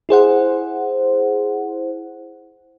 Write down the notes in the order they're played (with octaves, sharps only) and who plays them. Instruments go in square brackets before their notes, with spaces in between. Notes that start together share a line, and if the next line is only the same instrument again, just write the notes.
[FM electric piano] E4 G#4 C5 F#5